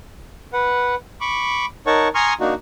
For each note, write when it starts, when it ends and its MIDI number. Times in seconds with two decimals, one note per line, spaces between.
0.53 0.95 71
0.53 0.95 78
1.21 1.66 83
1.21 1.66 85
1.21 1.66 86
1.87 2.08 63
1.87 2.08 70
1.87 2.08 73
1.87 2.08 78
1.87 2.08 81
1.87 2.08 85
2.15 2.33 80
2.15 2.33 82
2.15 2.33 84
2.15 2.33 85
2.15 2.33 87
2.15 2.33 89
2.40 2.54 58
2.40 2.54 62
2.40 2.54 63
2.40 2.54 66